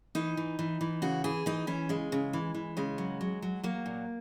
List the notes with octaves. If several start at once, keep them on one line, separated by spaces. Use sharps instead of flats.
E3 D#4
E3
E3
E3
C#3 F#4
E3 G#4
E3 D#4
E3 C#4
C#3 G#3
C#3
E3
E3
C#3 G#3
F#3
F#3
F#3
F#3 A#3
A#2